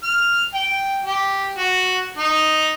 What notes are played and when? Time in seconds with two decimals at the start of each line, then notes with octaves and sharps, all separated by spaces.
0.03 F6
0.54 G5
1.04 G4
1.58 F#4
2.18 D#4